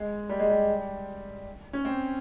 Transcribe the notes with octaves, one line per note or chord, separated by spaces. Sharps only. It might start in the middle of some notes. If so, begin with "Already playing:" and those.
Already playing: G#3
G3
G#3
G3
C#4
C4